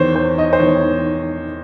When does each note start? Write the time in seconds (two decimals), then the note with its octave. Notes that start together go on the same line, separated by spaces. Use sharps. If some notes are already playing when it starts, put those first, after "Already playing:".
Already playing: E2 D#3 C5 C#5
0.16 C5
0.38 D#5
0.53 C5
0.60 E2 D#3 C#5